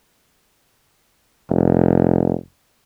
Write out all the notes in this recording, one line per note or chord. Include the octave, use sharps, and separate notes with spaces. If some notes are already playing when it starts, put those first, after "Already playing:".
F1